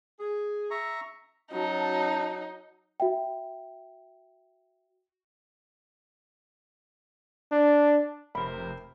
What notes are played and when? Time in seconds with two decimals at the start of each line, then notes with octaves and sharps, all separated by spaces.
0.19 G#4
0.71 E5 A#5 C#6
1.52 F#3 C#4 D#4 F#4 A5
3.00 F#4 E5 G5
7.52 D4
8.35 F1 C3 A#4 C5 B5